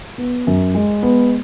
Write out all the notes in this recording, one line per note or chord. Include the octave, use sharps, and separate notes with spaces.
B3
F#2
G#3
B3